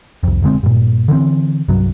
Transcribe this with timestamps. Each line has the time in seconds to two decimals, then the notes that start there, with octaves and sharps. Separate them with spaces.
0.23 C2 F2
0.42 E1 D3 G#3 C4
0.63 G2 A#2
1.08 D3 E3 B3 C4
1.68 C2 G2 F#3